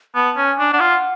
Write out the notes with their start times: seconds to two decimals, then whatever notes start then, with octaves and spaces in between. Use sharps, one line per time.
0.15 B3 A5
0.37 C#4
0.44 G#5
0.59 D4
0.73 D4 F#5
0.80 F4